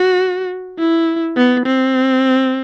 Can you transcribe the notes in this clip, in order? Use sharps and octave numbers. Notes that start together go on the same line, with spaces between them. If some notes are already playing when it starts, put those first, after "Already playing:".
Already playing: F#4
E4
B3
C4